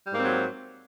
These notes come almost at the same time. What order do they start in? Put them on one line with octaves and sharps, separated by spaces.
G3 G#2 A#3 C4 F#3